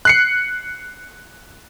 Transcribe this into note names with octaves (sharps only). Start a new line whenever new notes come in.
F#6 C7 C#7